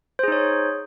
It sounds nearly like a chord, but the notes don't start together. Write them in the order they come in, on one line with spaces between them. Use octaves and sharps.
C5 G#4 D#4 C#5